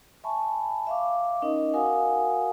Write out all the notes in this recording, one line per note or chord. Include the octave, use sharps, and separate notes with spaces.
E5 G#5 A5 B5 C#6
E5 F5 D6
C#4 D#4 A#4 D#5
F#4 A#4 F5 F#5 G#5 D#6